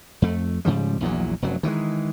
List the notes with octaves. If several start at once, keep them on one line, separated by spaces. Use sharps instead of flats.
F2 A3
G#2 C#3 F3 G3
A#1 E2 A#2 F#3
F1 F#2 F#3
D#3 E3 F#3 G#3